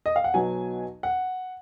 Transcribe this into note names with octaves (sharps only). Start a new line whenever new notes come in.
D#5
F5
F#5
B1 B2 F#3 B3 G#5
F#5